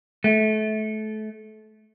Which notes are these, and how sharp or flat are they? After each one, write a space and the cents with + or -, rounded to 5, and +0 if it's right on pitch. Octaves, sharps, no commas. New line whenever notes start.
A3 -25